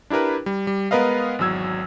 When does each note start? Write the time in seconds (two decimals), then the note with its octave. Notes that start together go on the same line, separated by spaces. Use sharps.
0.10 D4 E4 G4 A#4 B4
0.46 G3
0.67 G3
0.91 G#3 B3 A#4 B4 D#5 F5
1.39 G#1 E2 F#3 E6 G#6